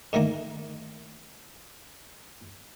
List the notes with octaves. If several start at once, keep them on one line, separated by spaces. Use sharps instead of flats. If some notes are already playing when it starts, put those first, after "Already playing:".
D3 D#3 A3 A#3